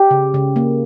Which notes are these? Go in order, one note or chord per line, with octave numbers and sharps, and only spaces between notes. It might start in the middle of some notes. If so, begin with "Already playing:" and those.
Already playing: G4
C#3
C#3
A#3